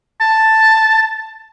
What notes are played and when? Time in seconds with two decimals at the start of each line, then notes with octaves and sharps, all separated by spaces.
0.21 A5